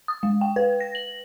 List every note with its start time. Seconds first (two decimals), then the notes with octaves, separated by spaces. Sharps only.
0.08 D#6
0.23 G#3
0.41 G5
0.56 B4
0.81 A#6
0.95 F#7